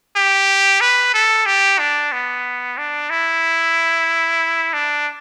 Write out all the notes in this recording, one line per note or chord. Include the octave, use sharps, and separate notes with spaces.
G4
B4
A4
G4
D4
B3
D4
E4
D4